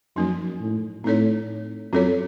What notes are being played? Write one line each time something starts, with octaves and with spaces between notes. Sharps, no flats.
F#2 F3 A#3 D#4
A2
A2 C4 D#4 A4 C#5
F#2 C4 F4 A4 C#5